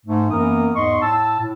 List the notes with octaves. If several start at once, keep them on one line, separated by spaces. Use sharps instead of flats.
G#2 A3
F#2 E3 A#3 B3 A#4 D#6
E2 G#2 D#5 C6 C#6
A2 A5 E6
A2